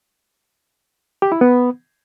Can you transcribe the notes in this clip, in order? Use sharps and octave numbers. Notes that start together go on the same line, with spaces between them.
G4
E4
B3